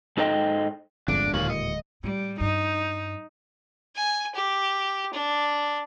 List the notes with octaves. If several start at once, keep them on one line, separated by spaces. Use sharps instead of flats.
G#2 D#4 A4 C5 D#5 G5
D1 G1 F2 G#3 D4 D7
D#2 A#2 F4 C#5 F#7
D#5 C#7
A2 G3
G2 D#4
G#5
G4
D4